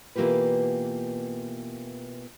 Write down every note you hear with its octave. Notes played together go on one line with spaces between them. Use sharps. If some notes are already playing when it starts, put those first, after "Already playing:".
B2 E3 A#3 F4 G4 B4